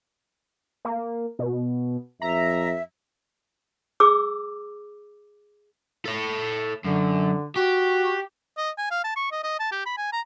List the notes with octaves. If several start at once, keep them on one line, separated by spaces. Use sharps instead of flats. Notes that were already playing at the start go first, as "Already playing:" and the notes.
A#3
B2
F2 E5 A#5
G#4 D6 E6
A4 C#5
F#2 D3
F#4 G4
D#5
G#5
F5
A5
C#6
D#5
D#5
A5
G4
B5
G#5
A#5